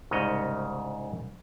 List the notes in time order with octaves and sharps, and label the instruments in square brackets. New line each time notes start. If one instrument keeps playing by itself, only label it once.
[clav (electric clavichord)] C2 G#2 C#3 C#5 D#5